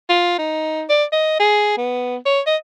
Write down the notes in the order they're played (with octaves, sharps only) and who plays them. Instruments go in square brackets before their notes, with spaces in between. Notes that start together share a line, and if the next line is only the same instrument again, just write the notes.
[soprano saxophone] F4
D#4
D5
D#5
G#4
B3
C#5
D#5